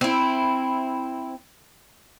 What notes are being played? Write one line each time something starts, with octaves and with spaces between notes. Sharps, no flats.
C4 E4